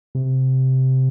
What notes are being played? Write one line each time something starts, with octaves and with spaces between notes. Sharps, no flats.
C3